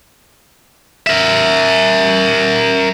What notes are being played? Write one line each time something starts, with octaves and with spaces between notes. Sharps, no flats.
A#4 E5